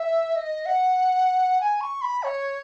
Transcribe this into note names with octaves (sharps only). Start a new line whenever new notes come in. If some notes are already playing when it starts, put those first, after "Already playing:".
Already playing: E5
D#5
F#5
G#5
C#6
B5
C#5